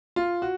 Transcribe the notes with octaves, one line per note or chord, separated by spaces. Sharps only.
F4
F#4